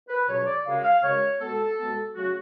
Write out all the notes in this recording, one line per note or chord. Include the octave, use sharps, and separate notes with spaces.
B4
C#2 B2 F#3 C#5
D5
F#2 C#3 G#3 F5
F5
F#2 C#3 G#3 C#5
B2 G#3 B3 A4
B2 G#3 B3
C#3 F#3 A3 F#4